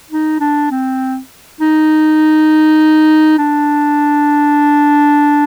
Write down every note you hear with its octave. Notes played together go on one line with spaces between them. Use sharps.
D#4
D4
C4
D#4
D4